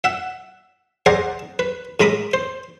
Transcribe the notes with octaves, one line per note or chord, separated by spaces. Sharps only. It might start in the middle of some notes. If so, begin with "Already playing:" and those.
E5 F#5
G#4 C5 D5 D#5 F#5 A#5
B4
A2 G#3 A#5 B5 D6 D#6
C5